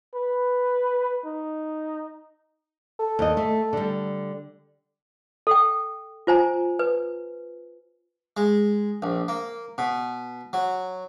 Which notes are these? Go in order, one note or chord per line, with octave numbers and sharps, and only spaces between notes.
B4
D#4
A4
D#2 D#5
A3
D3 G3
A4 G5
F4 C5 G#5 A#5
B4
G#3
A#1
A#3
B2
F#3